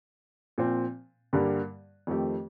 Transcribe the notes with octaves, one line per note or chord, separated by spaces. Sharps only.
A#2 F3 C4
G2 D3 G3 A#3
F2 D#3 A3 C4 G4